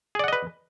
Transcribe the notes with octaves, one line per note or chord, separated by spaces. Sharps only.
G#4 B4 D5 D#5 F#5